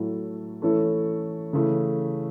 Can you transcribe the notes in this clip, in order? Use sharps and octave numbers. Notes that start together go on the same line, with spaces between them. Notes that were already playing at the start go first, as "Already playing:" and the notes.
Already playing: A2 F#3 A3 E4 A4
E3 A3 C#4 E4 A4
C#3 E3 A3